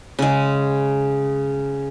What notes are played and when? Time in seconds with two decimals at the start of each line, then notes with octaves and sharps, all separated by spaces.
0.19 C#3 G#3